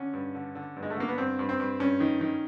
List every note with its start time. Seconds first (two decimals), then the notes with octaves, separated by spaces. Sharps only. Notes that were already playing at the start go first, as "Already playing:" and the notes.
Already playing: D3 C#4
0.13 G2
0.35 D3
0.55 D3
0.76 G2
0.83 G#3
0.90 A3
0.96 D3 A#3
1.09 B3
1.18 G2 C4
1.39 G2
1.49 C4
1.60 G2
1.80 G2 C#4
2.00 D#3
2.21 D#3